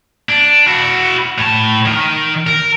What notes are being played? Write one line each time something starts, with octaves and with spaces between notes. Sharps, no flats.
D4
E4 F#4
A2 A5
D#3
A#4